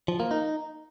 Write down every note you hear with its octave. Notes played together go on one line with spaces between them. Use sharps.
F3
A#3
D#4